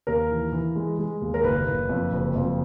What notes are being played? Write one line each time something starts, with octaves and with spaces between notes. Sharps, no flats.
D#2 A#4
E3
E3
G#3
G#3
D#2
A#4
F#1 B4
F#1
F2
F#1
F2